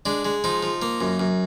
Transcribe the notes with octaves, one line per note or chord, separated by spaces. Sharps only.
G#3 D4
G#3
F3 D#4
F3
A#3
F#2
F#2